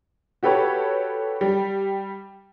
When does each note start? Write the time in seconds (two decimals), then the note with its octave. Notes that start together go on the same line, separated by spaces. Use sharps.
0.43 F#4 G4 A4 B4 C#5
1.41 G3